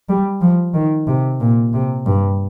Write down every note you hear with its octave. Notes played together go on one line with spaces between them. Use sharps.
G3
F3
D#3
C3
A#2
C3
G2